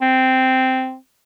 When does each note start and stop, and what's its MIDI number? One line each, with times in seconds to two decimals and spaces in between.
0.01 0.95 60